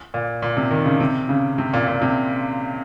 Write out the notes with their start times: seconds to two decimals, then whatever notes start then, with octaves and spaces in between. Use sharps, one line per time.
0.14 A#2
0.42 A#2
0.57 C3
0.71 D#3
0.86 C#3
1.00 C3
1.29 C#3
1.58 C3
1.73 A#2
1.88 A#2
2.02 C3